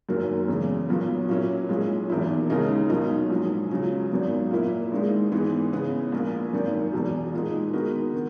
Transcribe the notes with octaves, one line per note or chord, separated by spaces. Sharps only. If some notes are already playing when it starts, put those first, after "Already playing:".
F#1 F#2 D#3 F#3 A#3
E2 C#3 G#3
B1 A#2 F#3 B3
A#2 F#3 C#4 E4
B1 A#2 G#3
E1 E2 D#3 A#3 E4
D#2 C#3 G#3 D#4 A#4
B1 B2 A#3 D#4
A#1 G#2 F#3
C#2 C#3 F#3
G#1 F#2 D#3 F#3 B3
A#2 A#3 E4
G#1 G#2 D#3 G#3
G#2 E3 G#3 B3
C#3 G#3 B3
A#1 A#2 A#3
G#1 F#2 D#3
E1 E2 B2
A#2 G#3 D#4
D#3 G#3 B3 F#4 A#4
D#3